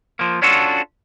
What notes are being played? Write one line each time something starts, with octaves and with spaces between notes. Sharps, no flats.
F3 A#3
C#4 D4 F4 F#4 A4